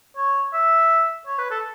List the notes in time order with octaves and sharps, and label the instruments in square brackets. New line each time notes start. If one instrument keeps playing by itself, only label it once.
[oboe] C#5
E5
C#5
B4
A4